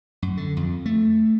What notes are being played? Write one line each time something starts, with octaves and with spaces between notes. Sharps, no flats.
F#2
D3
F2
A3